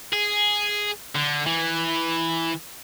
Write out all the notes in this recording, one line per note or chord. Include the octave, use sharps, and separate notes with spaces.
G#4
D3
E3